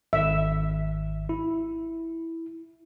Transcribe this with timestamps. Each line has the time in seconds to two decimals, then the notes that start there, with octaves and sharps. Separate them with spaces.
0.13 G#1 E5
1.29 E4